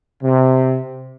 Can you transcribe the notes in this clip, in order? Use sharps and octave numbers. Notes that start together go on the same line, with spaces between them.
C3